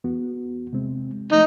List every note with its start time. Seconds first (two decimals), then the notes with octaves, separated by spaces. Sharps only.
0.04 E2 B3 F#4
0.73 C3 G#3 C4
1.32 F3 A3 D#4